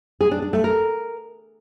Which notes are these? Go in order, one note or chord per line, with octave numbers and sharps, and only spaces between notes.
G#4
D4
D4
A3
A#4